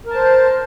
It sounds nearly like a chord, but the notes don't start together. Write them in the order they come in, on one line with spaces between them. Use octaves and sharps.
A#4 A5 C5